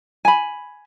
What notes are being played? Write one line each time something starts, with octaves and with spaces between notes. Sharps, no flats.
G#5 B5